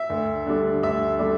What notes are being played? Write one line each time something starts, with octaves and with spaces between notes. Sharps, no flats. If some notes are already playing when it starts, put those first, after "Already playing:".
Already playing: E5
D2
D3 G3 D4
D2 E5
D3 G3 D4